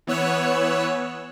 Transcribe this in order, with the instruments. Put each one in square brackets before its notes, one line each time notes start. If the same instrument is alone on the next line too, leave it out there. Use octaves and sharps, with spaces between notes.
[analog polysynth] E3 B3 C#5 E6 F#6